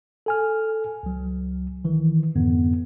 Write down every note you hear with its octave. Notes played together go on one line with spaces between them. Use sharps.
A4 G#5 F6
C#2 F#3
D#3 E3
F2 G#2 D3 B3